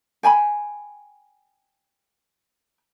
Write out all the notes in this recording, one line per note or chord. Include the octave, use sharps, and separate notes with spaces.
G5 G#5 A#5 B5